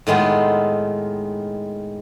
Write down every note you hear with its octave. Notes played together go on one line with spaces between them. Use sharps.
A2 D#3 G#3 B3 F4